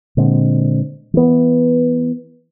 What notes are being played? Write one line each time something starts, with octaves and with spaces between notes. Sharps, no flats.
A#2 D3 G#3 C4
E3 B3